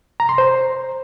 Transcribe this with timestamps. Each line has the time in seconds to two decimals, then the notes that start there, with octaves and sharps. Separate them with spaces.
0.20 A#5
0.29 C6
0.38 C5